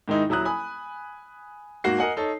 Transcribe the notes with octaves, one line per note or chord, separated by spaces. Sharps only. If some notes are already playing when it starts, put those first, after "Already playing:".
G#2 D#3 G#3 D#4 E4
D#1 F#3 E4 A#5 D#6 F#6
G#5 B5 D#6
G#2 A#3 F#4 C7
A#4 D#5 F#5 G#5
D#4 A4 C#5